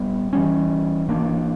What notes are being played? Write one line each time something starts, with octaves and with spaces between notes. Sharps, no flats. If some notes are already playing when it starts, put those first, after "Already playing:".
Already playing: A#2 G3 B3
E3 G3 C#4
E3 A#3 D4